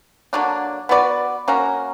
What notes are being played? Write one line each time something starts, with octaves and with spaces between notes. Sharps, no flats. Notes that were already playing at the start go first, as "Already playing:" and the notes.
D3 F#3 A#3 D4
B3 F#4 B4 D5
A#3 C#4 F#4 A#4